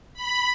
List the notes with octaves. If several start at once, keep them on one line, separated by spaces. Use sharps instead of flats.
B5